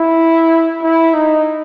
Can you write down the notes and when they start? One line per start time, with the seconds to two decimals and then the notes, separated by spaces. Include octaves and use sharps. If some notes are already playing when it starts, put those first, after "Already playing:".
Already playing: E4
0.82 E4
1.14 D#4